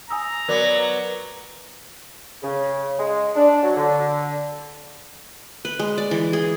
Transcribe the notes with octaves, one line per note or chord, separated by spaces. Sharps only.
G#5 A#5 D#6 E6
F#3 B3 A#4 D5 D6
C#3
G#3
D4
F#3
D3
B4
G#3
D5
E3
G#4